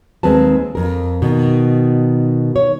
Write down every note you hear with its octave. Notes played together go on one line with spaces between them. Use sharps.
D#2 G#3 C4 B4 A5
F2 A#4
B2 D#3
C#5